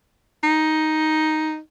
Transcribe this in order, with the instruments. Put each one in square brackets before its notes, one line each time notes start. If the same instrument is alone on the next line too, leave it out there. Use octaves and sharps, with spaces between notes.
[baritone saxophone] D#4